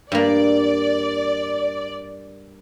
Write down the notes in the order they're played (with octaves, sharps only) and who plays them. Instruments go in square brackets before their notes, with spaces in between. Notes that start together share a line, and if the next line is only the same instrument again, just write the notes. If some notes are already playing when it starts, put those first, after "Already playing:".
[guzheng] G2 A#3 [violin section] D5